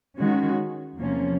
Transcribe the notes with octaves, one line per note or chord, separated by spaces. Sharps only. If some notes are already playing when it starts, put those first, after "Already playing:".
D#3 G#3 C#4 F#4
E2 C3 F3 A#3 C#4